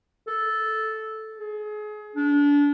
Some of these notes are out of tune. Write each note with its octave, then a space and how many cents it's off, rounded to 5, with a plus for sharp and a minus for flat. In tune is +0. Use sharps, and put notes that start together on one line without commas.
A4 -5
G#4 +30
D4 -30